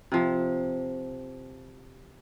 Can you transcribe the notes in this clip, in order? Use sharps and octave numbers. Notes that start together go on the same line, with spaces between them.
C3 F3